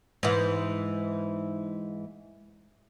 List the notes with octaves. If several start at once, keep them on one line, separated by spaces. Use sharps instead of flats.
G#2 E3